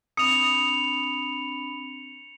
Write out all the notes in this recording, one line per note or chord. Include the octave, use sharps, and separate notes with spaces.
C4 D4 B5 D#6 C#7 F7